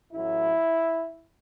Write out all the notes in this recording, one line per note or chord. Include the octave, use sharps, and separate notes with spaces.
A1 A2 F#3 E4